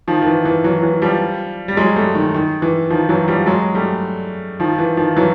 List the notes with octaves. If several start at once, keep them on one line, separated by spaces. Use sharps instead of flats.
D#3 F3
D#3
E3
E3
E3 F#3
E3
F3 G3
G3
F#3 G#3
G3 A3
D#3
D#3
E3
D#3 F3
E3 F#3
F3 G3
F#3 G#3
G3 A3
D#3 F3
E3
D#3 F3
E3 F#3